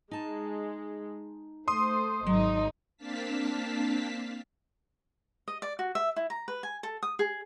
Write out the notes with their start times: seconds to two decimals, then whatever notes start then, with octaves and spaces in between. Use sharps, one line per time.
0.11 G#3 D#4 A5
1.68 A3 C5 C6 D#6
2.26 G#1 F#3 D#4
2.97 A#3 C4 D4 F5 A5 B6
5.48 D#5
5.62 D5
5.79 F#4
5.95 E5
6.16 E4
6.30 A#5
6.48 B4
6.63 G#5
6.83 A4
7.03 D#6
7.19 G#4